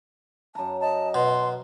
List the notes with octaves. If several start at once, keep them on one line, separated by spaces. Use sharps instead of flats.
F#2 A5 A#5
D#5 A5
B2 C6